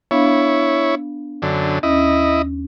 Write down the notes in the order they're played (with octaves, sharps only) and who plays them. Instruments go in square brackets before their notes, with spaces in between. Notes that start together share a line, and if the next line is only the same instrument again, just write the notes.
[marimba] B3 D4 F5 [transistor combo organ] E4 C#5
[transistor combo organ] F#2 D3
[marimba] D#2 C#4 [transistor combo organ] E4 D#5